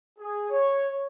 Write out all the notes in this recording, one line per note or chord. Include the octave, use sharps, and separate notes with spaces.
G#4
C#5